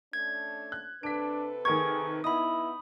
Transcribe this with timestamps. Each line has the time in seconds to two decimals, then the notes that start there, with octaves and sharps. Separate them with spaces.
0.13 A3 C#4 D4 G#6
0.72 F#6
1.03 C3 D4 A4 B4 B6 D7
1.65 D#3 G#4 A#4 C#6 G#6
2.24 B3 D#4 E4 B5 D#6